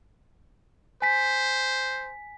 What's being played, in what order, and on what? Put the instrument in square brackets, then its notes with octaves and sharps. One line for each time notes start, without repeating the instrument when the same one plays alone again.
[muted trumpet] C5 [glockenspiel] G#5 B6